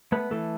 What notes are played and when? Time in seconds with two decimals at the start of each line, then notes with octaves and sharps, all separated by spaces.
0.12 A3 B3 B4
0.31 E3 A3 A4